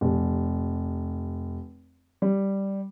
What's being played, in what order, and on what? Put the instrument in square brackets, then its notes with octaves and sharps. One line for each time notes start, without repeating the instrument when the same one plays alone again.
[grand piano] F1
G3